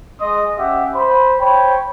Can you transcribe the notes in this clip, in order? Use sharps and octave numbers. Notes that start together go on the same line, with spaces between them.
G#3 D#5 C6 D#6
C#4 G4 E5 F#5
C5 B5
C5 C#5 G5 B5